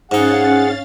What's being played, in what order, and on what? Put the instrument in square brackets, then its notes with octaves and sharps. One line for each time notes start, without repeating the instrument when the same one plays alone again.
[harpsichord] G#2 D#4 [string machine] C#4 F5 A6 [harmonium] G#4 F#5